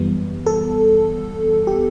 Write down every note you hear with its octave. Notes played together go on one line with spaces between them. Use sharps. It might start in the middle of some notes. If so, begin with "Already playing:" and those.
Already playing: F#2 E3 G3 B3
A4
G4